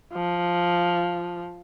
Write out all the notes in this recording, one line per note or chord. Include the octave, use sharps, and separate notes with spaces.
F3